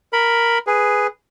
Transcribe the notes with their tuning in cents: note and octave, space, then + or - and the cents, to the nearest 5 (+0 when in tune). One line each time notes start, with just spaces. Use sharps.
A#4 +0 B5 +0
G#4 +0 B4 +0